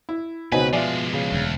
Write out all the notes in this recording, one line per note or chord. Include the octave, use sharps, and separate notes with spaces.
E4
C#2 B2 C4 D#4 F#4 B4 C#5 G#5
F3 G#3 F4 D5 E5 G#5
C#3
E1 D2